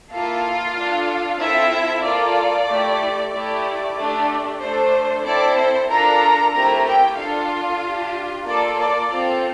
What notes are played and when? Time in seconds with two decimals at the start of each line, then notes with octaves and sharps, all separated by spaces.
0.12 A#3 E4 F4 A4 F5
0.76 D4 A4
1.40 C4 E4 F4 A4 E5
2.05 A#3 F4 A4 D5
2.69 A3 E4 G4
3.32 A3 E4 G4 D5
3.97 A3 D4 G4
4.61 A3 D4 A4 C5
5.25 C4 E4 A4 D5
5.57 C5
5.89 D4 F4 A4 A#4 A#5
6.53 A3 C4 E4 G4 A#4 A#5
6.86 G4 G5
7.17 D4 F4 A4 F5
7.82 D4 G4
8.46 A#3 F4 A4 D5
8.78 D5
9.10 C4 F4 A4